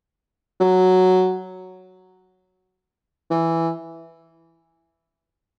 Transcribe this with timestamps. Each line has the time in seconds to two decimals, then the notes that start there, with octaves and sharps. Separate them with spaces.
0.60 F#3
3.30 E3